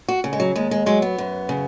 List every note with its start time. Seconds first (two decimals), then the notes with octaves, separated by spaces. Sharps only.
0.08 F#4
0.24 C#3
0.33 G#3
0.40 F#3
0.55 D#2 G#3
0.71 G#3
0.86 F#3 G#3
1.02 B3
1.18 F#2
1.49 C#3